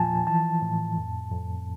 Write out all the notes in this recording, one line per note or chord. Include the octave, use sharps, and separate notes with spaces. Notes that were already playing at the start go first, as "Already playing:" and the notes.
Already playing: E2 A#2 F3 G#5 A5
E3 A5
A2
F2
F2